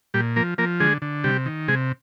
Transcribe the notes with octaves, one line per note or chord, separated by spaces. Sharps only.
A#2 G3 G4
F3 A#3 A#4
F3 A#3 A#4
D3 G#3 G#4
D3
C3 G3 G4
D#3
C3 G#3 G#4